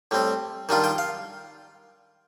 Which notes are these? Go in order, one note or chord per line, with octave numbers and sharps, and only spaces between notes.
A2 G3 C4
D#3 G3 D4 F4
G5
F5